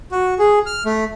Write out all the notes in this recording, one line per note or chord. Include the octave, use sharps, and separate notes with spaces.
F#4
G#4
F6
A3